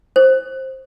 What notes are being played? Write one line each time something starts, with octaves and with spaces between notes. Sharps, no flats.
C5